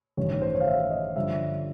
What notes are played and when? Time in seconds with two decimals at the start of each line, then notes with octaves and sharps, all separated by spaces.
0.17 A1 G2 D#3 C#5
0.30 C#5
0.42 C5
0.55 C#5
0.60 F5
0.67 E5
0.91 D#5
1.16 G2 D3 F3 E5